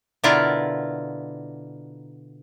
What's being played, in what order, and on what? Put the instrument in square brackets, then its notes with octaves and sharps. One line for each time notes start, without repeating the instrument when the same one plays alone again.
[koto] B2 D3 E4 F4 A#4 D5